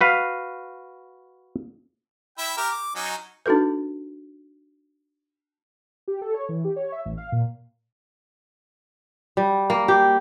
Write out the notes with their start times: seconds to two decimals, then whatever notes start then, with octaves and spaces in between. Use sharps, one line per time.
0.01 F#4 B4 F5
2.38 E4 E5 G5
2.57 G4 A#4
2.70 D6
2.95 F#3 C#4 D#4
3.46 D4 D#4 F#4 A4 B4
6.08 G4
6.21 A4
6.34 C#5
6.49 E3
6.65 G4
6.76 C#5
6.92 E5
7.05 A1
7.17 F5
7.32 A#2
9.37 G3
9.70 A#3
9.88 G4